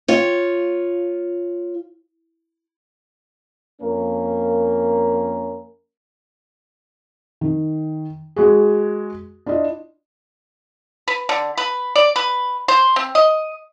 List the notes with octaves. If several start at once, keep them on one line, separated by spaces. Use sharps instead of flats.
F4 C#5
F2 A#3 C#4 A#4
D#3
G#3 F#4 G#4
D4 E4 F4 D#5
B4
D3
B4
D5
B4
C5
C4
D#5